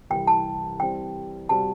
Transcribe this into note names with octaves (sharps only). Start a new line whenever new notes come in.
C2 C3 E3 G5
A5
E3 G3 C4 G4 G5
C3 G3 C4 F#4 A5